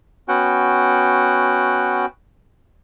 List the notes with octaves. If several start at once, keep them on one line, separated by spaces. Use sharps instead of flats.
B3 C#4 F#4 F#5 G5